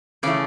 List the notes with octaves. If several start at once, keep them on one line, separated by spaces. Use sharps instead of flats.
C#3 E3 A3 D5